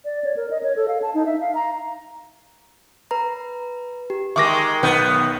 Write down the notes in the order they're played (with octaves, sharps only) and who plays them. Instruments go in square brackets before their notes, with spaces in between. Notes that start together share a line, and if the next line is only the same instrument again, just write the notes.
[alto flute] D5
C#5
A#4
D#5
C#5
A4
F5
A5
D#4
E5
F5
A#5
[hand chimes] B4 A#5
G4
[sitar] D#3 G#3 [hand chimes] E5 [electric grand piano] C#6 D6 A#6
[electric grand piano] B1 D#3 G6 [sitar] B3